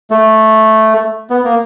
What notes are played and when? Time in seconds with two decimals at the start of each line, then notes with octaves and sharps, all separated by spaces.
0.11 A3
1.30 B3
1.45 A#3